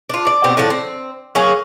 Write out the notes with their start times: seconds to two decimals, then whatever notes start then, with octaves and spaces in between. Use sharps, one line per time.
0.09 D4 F4
0.27 D5
0.44 B2 C4 G4
0.57 A2 D3 F3 D4
0.70 C4
1.35 F#3 A#3 G#4 F5